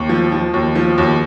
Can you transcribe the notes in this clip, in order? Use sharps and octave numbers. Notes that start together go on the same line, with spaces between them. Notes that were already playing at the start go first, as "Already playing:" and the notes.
Already playing: D#2
F3
F3
D#2
F3
D#2